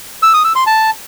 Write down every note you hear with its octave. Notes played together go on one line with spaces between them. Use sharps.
E6
D#6
E6
C6
A5